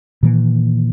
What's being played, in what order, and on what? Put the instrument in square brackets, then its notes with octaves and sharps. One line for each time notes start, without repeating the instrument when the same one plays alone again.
[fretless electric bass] A#2 D#3 E3 A#3